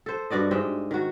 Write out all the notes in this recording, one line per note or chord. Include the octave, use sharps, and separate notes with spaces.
A4 C5
G2 F#4 D5 D#5
G#2 G#3 E5 G5
D#3 F#4